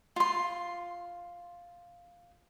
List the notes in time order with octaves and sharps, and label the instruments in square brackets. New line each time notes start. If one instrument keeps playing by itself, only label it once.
[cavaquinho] F4 C6